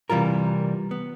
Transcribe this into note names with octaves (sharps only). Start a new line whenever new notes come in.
C3 E3 G3 F4 A#4
B3